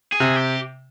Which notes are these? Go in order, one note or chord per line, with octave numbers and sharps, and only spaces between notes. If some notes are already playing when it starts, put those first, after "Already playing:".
G#4
C3
G4